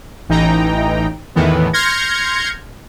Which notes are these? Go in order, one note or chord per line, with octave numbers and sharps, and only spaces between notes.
A1 E3 D#4 G5 A#5
E2 A2 D#3 E3 B3
C6 F6 G6 G#6 A#6 C#7